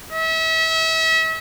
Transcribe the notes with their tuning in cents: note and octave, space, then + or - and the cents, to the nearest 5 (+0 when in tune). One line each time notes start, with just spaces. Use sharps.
E5 -35